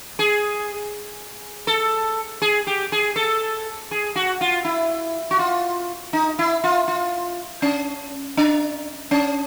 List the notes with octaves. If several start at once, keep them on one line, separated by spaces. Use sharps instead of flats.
G#4
A4
G#4
G4
G#4
A4
G#4
F#4
F4
E4
F#4
F4
D#4
E4
F4
F4
C#4
D4
C#4